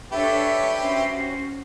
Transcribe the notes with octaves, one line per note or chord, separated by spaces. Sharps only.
D4 G4 A4 B4 C#5 E5
C#4 F#4 C5